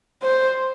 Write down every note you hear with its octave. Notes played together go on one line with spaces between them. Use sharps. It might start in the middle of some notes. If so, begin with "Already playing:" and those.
C5